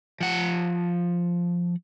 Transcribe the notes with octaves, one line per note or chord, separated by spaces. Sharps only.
F3 F#5